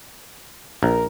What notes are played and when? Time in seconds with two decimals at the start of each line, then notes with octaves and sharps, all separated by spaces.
0.83 A#1 A#4